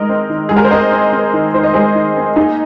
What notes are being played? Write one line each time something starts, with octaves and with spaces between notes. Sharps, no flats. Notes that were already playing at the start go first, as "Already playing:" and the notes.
Already playing: D#3 G#3 A#4 D#5
C4
D#3
G#3 G#4
A#4
C5
C4 A#4 D#5
C4
C4
D#3
D#3 C5
D#5
G#3 G#4 C5
D#3
C4
A#3 D#4 G#4